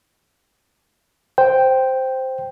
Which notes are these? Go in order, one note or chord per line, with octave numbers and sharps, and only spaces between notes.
C5 G5